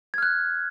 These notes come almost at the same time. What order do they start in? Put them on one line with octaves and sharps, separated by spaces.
G#6 F6 F#6